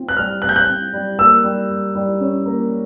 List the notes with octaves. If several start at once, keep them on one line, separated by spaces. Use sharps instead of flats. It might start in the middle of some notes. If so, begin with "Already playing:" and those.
Already playing: C4 F4
F#6
G3 F6
C4 F#6
G6
F#6
C4
G3
A#3 E6
G3
G3
G3
C#4
A#3